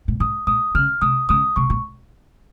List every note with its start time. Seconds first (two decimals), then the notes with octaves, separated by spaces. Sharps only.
0.08 A#2
0.20 G#2 D#6
0.47 A#2 D#6
0.75 C#3 F6
1.02 C3 D#6
1.29 C#3 D#6
1.56 C3 C#6
1.70 A#2